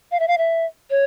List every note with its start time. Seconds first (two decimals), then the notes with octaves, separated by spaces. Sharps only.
0.12 F5
0.20 E5
0.28 F5
0.38 E5
0.90 C#5